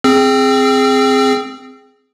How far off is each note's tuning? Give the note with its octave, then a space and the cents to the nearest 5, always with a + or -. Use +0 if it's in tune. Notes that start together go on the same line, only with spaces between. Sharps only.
C4 +0 G#4 +0 E6 +40